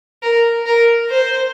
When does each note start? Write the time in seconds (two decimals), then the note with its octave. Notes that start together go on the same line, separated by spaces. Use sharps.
0.22 A#4
0.66 A#4
1.09 C5